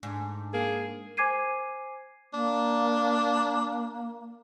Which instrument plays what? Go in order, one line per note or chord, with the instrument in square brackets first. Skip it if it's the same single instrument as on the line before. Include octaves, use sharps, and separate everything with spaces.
[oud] G#2 [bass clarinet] D4
[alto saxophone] A#3 [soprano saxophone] G#4
[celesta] C5 G#5 D6 G#6 C7 D#7
[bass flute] A#3 [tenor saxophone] D4